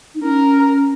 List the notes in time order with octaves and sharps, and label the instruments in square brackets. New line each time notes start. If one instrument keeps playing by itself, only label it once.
[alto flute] D#4
[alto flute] C#4 [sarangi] A#4